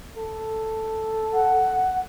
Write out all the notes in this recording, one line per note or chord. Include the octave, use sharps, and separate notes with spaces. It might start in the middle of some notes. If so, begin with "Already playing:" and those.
A4
F#5